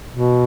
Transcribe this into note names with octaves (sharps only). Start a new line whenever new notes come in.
B2